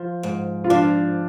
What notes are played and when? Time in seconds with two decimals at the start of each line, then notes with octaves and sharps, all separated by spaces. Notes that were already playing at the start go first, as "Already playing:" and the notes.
Already playing: F3
0.23 G#2
0.64 F4
0.70 F3 D4